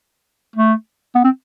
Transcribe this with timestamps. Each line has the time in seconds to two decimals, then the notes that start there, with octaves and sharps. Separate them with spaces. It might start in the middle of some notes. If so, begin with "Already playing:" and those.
0.56 A3
1.15 B3
1.25 C4